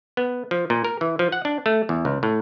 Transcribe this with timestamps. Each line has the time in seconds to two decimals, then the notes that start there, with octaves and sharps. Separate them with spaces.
0.17 B3
0.51 F3
0.70 A#2
0.85 A#4
1.01 E3
1.19 F3
1.32 F#5
1.45 D4
1.66 A3
1.89 E2
2.05 C#2
2.23 A2